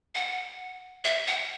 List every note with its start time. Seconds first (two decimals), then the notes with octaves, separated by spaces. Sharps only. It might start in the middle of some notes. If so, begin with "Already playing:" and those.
0.15 F#5
1.04 E5
1.28 F#5